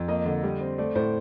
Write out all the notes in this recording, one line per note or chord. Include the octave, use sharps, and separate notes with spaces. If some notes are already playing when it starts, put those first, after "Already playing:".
Already playing: F2
A#3 D#5
D3
G3
C4
A3 D5
A2 C5